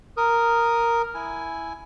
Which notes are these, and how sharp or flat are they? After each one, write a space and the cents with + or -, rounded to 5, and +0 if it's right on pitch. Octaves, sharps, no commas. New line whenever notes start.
A#4 +0 D#6 +0
E4 +0 G#5 +5